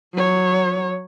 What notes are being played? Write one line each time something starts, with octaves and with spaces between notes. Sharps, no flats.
F#3 C#5